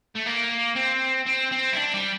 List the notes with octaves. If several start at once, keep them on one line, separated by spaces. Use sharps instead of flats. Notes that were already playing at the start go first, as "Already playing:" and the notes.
A3
A#3
C4
C4
C4
E4
D4
G3